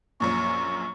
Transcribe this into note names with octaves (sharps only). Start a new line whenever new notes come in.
A#1 F#2 A#2 C#6